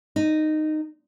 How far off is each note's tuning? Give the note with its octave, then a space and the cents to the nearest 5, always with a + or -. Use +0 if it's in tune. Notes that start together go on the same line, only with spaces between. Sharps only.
D#4 -10